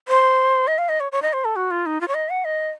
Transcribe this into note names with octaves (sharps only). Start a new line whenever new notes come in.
C5
D#5
F5
D#5
C#5
C#5
D#5
C5
A4
F#4
F4
D#4
F4
C#5
D#5
F#5
D#5